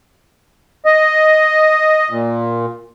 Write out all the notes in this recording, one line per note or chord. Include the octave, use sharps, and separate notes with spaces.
D#5
A#2